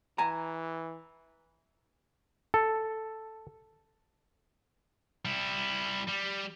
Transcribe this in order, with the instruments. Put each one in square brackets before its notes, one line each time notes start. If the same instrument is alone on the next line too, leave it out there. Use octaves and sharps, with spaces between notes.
[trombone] E3 [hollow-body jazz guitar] G#5 A#5
[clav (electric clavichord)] A4
[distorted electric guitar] G3 E4
G3